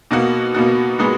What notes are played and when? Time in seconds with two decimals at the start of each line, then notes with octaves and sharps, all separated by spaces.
0.11 B2 A#3 D#4 F#4
0.54 B2 A#3 D#4 F#4
0.99 A#2 G#3 B3 D#4 F#4